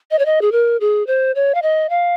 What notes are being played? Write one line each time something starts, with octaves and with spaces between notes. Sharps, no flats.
D#5
C#5
D#5
G#4
A#4
G#4
C5
C#5
F5
D#5
F5